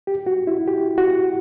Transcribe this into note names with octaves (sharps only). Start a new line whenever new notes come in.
G4
F#4
E4
G4
F#4